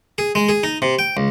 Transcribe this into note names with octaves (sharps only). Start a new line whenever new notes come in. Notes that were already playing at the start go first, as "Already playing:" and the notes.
G#4
G#3
G#4
D#4
C3
G5
C#2